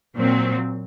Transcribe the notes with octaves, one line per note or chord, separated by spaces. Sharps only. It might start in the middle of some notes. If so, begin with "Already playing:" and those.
A#2 F#3 C4